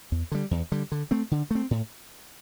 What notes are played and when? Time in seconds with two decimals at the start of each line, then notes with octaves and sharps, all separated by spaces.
0.12 E2
0.32 D3 G3
0.51 E2
0.72 D3 G3
0.92 D3
1.11 A3 C4
1.31 D3
1.51 A3 C4
1.71 A2